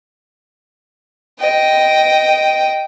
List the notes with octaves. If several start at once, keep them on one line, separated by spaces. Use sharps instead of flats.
D#5 G5